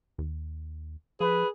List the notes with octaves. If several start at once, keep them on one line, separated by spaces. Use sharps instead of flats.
D#2
F3 G#4 B4